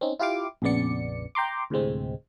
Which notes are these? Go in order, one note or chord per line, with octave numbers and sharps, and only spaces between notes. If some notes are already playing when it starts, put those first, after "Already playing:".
C4 C#4 D#4
E4 F4 G4 F5 D6
A#1 F2 C#3 B3 D5 C#7
G5 A#5 C6 D6
D2 A2 C3 G#3 C4